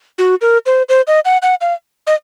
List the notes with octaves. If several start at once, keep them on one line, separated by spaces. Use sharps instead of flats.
F#4
A#4
C5
C5
D#5
F#5
F#5
F5
D#5